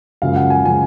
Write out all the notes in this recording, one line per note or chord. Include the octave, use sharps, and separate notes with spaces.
F#2 C#3 F3 G#3 F5
F#5
G#5
C#3 F3 G#3 G#5